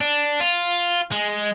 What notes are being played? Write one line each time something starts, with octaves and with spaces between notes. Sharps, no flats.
D4
F4
G#3